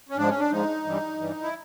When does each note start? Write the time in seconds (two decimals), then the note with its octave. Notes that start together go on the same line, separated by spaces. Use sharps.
0.09 C#4
0.17 G#2 F3 G#3 D4
0.29 C#4
0.40 D4
0.51 G#2 F3 G#3 D#4
0.85 G2 E3 G3
1.20 G2 E3 G3
1.43 E4